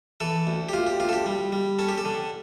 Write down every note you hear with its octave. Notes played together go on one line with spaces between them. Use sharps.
E3 A4
D2
G4
D2 F4
G4
D2 F4
A4
G4
G3
G3
C#4 A4
G4
A4
D3